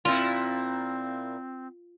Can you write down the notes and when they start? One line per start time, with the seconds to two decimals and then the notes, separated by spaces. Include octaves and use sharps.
0.05 A#2 C4 E4 F4